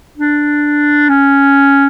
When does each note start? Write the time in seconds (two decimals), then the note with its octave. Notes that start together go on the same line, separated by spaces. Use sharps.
0.18 D4
1.09 C#4